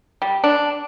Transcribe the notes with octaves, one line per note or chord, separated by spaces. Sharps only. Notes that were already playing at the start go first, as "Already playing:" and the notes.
G3
D4